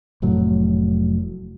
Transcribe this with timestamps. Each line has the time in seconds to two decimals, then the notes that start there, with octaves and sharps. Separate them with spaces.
0.22 F1 A2 F#3